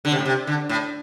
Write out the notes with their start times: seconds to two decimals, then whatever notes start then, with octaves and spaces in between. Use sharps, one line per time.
0.05 D3
0.12 C3
0.19 A2
0.25 C3
0.47 D3
0.69 A2